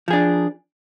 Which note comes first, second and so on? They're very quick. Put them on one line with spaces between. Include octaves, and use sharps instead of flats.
F3 G#4 D4